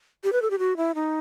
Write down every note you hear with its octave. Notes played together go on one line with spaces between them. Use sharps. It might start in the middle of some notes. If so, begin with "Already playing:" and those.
G4
B4
A4
G4
F#4
E4
D#4